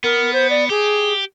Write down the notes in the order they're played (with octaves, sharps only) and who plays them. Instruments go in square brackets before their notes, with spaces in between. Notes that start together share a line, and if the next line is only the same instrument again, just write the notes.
[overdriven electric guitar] B3 [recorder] A#4
[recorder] C5
D5
[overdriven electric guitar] G4 [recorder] G#4